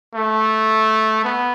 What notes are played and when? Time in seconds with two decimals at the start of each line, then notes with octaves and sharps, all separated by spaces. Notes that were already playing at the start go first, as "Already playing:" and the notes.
0.15 A3
1.24 B3